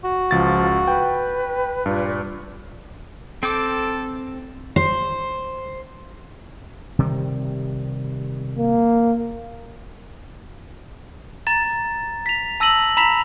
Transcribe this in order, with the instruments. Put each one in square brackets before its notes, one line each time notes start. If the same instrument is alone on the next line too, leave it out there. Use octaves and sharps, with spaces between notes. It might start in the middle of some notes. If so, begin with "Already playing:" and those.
[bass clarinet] F#4
[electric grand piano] C#2 A6 [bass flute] F3
[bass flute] B4 [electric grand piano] G5
[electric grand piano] G2 [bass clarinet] A#2
[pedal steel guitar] C4 G5 D6 [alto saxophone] A4
[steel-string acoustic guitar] C5
[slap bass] C3 D#3 G3
[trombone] A#3
[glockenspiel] A#5 A6
B6 F7
A5 E6 A#6 D#7 F#7
A#5 B5 B6 F7